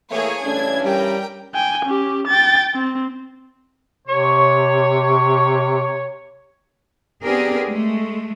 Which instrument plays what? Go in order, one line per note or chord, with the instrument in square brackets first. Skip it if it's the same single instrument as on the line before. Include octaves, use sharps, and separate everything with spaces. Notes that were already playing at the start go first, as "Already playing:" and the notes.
[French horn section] E3 A3 [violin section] A#3 G#4 C#5
[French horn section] G2 E3 C#4 [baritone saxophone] A3 [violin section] D4 G#6
[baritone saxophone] G3 [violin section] A#4 G5
[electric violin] G5 G#5
C#4 G4
G5 A6
C4
[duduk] C3 [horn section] C#5
[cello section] B3 C4 D4 G4 G#4 A#4
G#3 A3